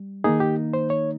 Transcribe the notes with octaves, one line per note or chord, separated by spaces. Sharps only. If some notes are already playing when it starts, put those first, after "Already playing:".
Already playing: G3
D#3 A#3 D#4 G#4
G4
C5
C#5